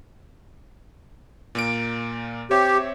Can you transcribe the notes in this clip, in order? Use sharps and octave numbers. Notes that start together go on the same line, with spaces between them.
A#2 A#3 D7
C4 G4 C#5 E5